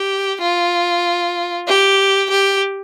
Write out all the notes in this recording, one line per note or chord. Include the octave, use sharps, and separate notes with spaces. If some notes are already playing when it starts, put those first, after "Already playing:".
Already playing: G4
F4
G4
G4